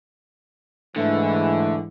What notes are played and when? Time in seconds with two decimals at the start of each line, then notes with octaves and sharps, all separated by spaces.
0.97 G#2 D3 E3 A3